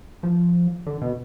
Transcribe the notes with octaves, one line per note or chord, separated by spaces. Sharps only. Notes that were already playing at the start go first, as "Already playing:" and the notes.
F3
D3
B2